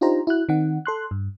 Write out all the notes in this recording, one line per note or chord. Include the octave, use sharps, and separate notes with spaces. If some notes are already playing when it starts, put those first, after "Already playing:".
D4 D#4 F4 G4 C5 A#5
E4 F#4 F#6
D#3 C4 D#4 F#5
A4 C6 F#6
G2